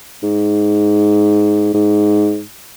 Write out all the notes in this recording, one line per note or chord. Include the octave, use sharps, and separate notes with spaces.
G#2
G#2